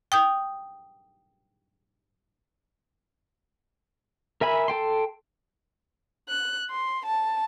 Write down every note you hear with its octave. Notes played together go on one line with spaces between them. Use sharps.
G5 D#6 G6
A#4 E5 G#5 B5
A4 G5 C6
F#6
C6
A5